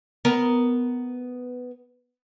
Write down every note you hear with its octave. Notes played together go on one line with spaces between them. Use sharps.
B3 A#4